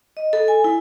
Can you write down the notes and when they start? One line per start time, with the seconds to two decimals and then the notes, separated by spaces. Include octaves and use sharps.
0.17 D#5
0.33 A4
0.48 G#5
0.64 E4